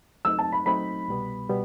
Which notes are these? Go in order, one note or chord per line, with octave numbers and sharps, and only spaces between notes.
F#3 A3 C4 D#4 E6
A5
B5
F#3 A3 C4 D#4 B5
C2 B2 G3 B3
B2 G3 B3